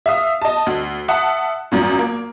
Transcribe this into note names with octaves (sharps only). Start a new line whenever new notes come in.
E5 F5 D#6
D#5 A5
D2
E5 F#5 A5 D#6
G#1 F#2 A#2
A#3